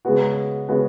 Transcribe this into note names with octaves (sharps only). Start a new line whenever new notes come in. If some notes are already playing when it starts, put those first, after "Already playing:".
C#3 G#3 B3 F#4
C#3 G#3 B3 F#4